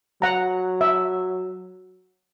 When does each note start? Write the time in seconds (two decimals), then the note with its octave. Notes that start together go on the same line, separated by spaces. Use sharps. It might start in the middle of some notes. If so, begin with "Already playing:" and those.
0.22 F#3 F#5 A#5
0.81 E5